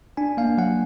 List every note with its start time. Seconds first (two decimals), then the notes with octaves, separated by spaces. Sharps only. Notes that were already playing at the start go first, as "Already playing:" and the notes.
0.17 D4 G#5
0.37 A#3 F5
0.58 F#3 F#5